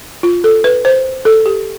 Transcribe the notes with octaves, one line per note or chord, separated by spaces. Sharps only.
F4
A4
B4
C5
A4
G4